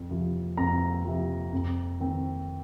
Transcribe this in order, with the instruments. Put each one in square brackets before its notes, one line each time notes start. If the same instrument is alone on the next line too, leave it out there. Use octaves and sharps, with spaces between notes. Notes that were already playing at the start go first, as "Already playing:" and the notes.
Already playing: [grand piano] F2
C3 F3
F2 A#5
C3 F3
F2
D#3 C4